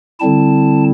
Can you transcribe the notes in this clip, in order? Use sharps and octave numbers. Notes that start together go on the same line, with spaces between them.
D3 G3 C4 E4 A5